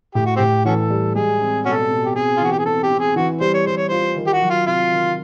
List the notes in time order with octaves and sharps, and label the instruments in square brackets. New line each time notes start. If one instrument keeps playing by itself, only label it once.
[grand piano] A2 [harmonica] G4
[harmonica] F#4
[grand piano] A2 [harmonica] C4 G4
[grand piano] E3 [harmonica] C#4 F#4 A4
[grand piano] G3
[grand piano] G#3 [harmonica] G#4
[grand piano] C4
[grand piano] B2 [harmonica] C#4 F#4 A4
[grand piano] B2
[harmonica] G4
[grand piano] C4 [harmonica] G#4
[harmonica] F4
[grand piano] E3 [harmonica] F#4
[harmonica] G4
G#4
[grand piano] C4 [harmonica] A4
[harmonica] G4
[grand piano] C4
[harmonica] G#4
[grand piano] E3 [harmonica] F#4
[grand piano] G3 [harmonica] C5
[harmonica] C#5
[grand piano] G3 [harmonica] C5
[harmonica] C#5
[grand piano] F4 [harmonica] C5
[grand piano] D#3
[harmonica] G4
F#4
[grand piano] F#3
[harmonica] F4
[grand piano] C3 [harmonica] F4
[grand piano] D#3